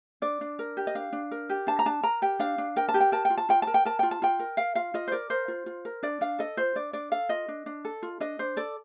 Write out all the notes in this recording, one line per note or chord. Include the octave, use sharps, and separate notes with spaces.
D4 D5
D4
A#4
G4
D#5
D4 F5
D4
A#4
G4
D4 A5
A#5
D4 A5
A#4 A#5
G4 G5
D4 F5
D4
A#4 G5
A5
G4
G5
A#4 A5
G5
F4
A5
F4 G5
A#4 A5
G5
A#4 A5
F4 G5
A5
F4 G5
A#4
A#4 F5
F4 F5
F4 D#5
C5
A#4 D5
A#4 C5
F4
F4
A#4
D4 D5
D4 F5
A4 D#5
F4 C5
D4 D5
D4 D5
A4 F5
F4 D#5
D4
D4
A4
F4
D4 D#5
D4 C5
A4 D5